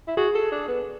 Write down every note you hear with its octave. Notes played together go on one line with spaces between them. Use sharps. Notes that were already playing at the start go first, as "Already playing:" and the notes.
E4
F#4 G#4
A4
D4
B3